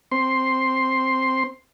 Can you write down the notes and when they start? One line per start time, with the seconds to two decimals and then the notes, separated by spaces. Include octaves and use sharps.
0.12 C4 C6